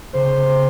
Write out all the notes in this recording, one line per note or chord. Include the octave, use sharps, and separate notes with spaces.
C#3 C5